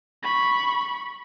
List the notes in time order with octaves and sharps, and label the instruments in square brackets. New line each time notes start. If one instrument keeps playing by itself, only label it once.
[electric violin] B5 C#6